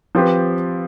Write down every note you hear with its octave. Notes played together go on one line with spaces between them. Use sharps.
F3 C4 G4 B4